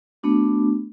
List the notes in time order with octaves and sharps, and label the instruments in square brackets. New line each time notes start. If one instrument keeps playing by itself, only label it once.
[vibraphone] A3 B3 D4 F#4